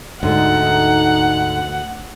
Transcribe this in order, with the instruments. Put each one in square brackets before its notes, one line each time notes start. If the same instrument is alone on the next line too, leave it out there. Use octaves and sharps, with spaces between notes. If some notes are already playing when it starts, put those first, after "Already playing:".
[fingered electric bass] D2 [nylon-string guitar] G#2 D3 [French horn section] D#4 [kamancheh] F#5